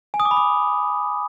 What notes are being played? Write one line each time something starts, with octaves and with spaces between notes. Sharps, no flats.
G#5
D#6
D6
B5
D6